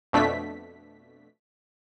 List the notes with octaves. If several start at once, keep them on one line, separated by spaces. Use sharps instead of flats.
F2 B2 A3 D4 B6